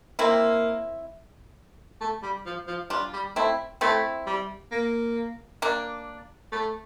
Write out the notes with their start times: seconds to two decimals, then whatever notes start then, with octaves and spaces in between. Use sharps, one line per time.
0.19 A#3 C4 E4
2.01 A3
2.23 G3
2.46 F3
2.67 F3
2.90 G3 D4 F4
3.13 G3
3.36 A3 C4 E4
3.81 A3 C4 E4
4.27 G3
4.71 A#3
5.62 A#3 D4
6.52 A3